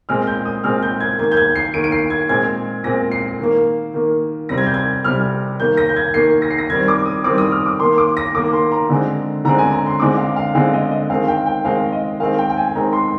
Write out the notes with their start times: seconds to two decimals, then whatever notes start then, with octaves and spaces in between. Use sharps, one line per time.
0.09 A#2 G#3 C4 F6
0.27 G6
0.45 D#6
0.64 A#2 G#3 C4 F6
0.83 G6
1.00 G#6
1.19 D#3 A#3 G#6
1.32 G6
1.37 G#6
1.55 C7
1.74 D#3 A#3 D7
1.84 D7
1.92 C7
2.10 G#6
2.29 A#2 G#3 C4 G#6
2.84 A#2 G#3 C4 A#6
3.12 C7
3.39 D#3 A#3
3.94 D#3 A#3
4.49 C3 G3 C4 A#6
4.58 G#6
4.66 G6
4.74 G#6
5.04 C3 G3 C4 F6
5.60 D#3 A#3 G6
5.77 A#6
5.89 G6
5.96 G#6
6.14 D#3 A#3 C7
6.42 A#6
6.51 C7
6.58 A#6
6.70 D#3 G3 C4 G#6
6.88 D6
7.06 D#6
7.24 D#3 G3 C4 D6
7.38 D#6
7.52 F6
7.66 D6
7.80 D#3 A#3 C6
7.98 D6
8.17 A#6
8.35 D#3 A#3 D6
8.53 C6
8.72 A#5
8.89 D3 G#3 C4
9.45 D3 G#3 C4 A#5
9.58 G#5
9.73 A#5
9.86 C6
10.00 D3 G#3 C4 D6
10.18 F5
10.36 F5
10.55 D3 G#3 C4 F5
10.73 D#5
10.91 D#5
11.10 D#3 G#3 C4 F5
11.28 G5
11.46 G5
11.65 D#3 G#3 C4 F5
11.92 D#5
12.20 D#3 G#3 C4 F5
12.38 G5
12.50 G5
12.57 G#5
12.75 D#3 G#3 C4 A#5
12.93 C6